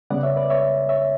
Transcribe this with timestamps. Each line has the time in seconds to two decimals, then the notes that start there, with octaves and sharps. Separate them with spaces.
0.10 C#3 G3 B3 D5 F#5
0.23 C#5 E5
0.36 B4 D5
0.50 C#5 E5
0.89 C#5 E5